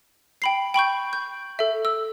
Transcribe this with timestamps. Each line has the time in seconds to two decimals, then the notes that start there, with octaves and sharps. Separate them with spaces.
0.42 G5 B5 C7
0.74 G5 B5 C#6 G6
1.13 G6
1.59 A4 E5
1.85 E6